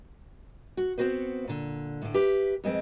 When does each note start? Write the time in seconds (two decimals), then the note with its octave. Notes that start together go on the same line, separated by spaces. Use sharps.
0.77 F#4
0.98 B3 C4 F#4 B4 C5
1.48 A#2 D3
2.02 A2 D3
2.14 G4 B4 E5
2.64 F2 G#3 C4 B4